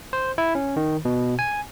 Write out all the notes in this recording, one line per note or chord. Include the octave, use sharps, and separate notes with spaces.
C5
E4
C#4
D#3
B2
G#5